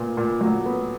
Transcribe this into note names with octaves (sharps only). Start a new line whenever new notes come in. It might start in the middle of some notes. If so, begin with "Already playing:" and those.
Already playing: A#2 B3
A#2
F#3
B3